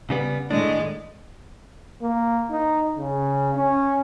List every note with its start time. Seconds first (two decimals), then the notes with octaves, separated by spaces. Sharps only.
0.10 C#3 G3 B3
0.51 A2 D#3 G#3 D4
2.02 A#3
2.51 D#4
2.97 C#3
3.56 C#4